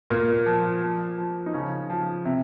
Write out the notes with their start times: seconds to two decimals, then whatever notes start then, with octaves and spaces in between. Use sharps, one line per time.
0.10 A#2 A#3
0.46 F3
0.82 F3
1.18 F3
1.46 D#4
1.53 C#3 F3 C#4
1.90 F3
2.25 C3